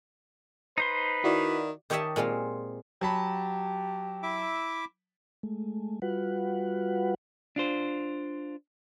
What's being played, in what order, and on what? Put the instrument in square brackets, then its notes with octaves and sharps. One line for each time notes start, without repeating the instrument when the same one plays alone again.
[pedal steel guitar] D#4 C5 C6 [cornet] B4
[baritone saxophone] D#3 [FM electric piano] E4 F#4 D5
[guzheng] D#3 G4 C#5 D#5 E5 A5
A#2 G#3 C4 F4
[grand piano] F#3 A5 B5 [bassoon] G4
[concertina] E4 E5 D6
[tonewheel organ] G#3 A3
G3 F4 F#4 B4 F#5
[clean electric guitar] D4 F4 C5